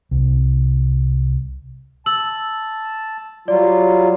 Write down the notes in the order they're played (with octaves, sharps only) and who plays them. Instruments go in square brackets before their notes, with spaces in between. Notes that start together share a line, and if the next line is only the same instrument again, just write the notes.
[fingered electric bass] C2
[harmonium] A5 [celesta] E6 F#7
[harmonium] F#3 G3 F4 [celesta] D5